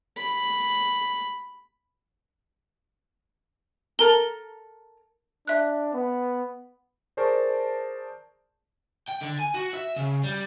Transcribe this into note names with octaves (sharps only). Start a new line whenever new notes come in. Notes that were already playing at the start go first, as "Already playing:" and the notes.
B5
A4 A#4 A#5 G7
D4 E5 F#6
B3
G#4 A#4 C5 D5 A5 C#6
G5
D3
G#5
F#4
E5
C#3
G3